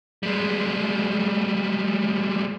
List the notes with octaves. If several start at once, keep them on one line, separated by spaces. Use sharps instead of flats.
G3 G#3